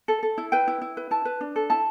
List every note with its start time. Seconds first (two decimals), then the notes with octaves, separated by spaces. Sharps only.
0.08 A4
0.23 A4
0.38 E4
0.52 B4 G5
0.68 E4
0.82 E4
0.97 B4
1.11 E4 A5
1.25 B4
1.41 D4
1.56 A4
1.70 E4 A5